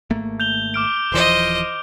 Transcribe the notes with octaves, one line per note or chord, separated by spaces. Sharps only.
G#1 A3 A#3
G6 F7 G7
D6 F6 D7
D#1 E3 F3 C5 D#5